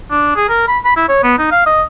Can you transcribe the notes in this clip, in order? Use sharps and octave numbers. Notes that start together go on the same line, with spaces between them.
D4
G#4
A#4
B5
B5
E4
C#5
B3
D#4
F5
D#5